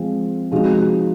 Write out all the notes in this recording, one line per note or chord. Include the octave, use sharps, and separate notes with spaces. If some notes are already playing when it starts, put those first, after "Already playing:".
Already playing: F3 G#3 C4 F4
C3 F3 G#3 D#4 F#4